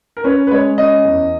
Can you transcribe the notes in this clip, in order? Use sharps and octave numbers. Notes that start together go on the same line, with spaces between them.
A#4
C#4 B4
B4
G#3 C#5
C#4 D#5
E2